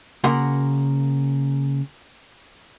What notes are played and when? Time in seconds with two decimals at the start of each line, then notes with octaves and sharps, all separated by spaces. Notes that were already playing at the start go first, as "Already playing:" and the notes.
0.24 C#3 A#3 F#4 A#4 F#5 C6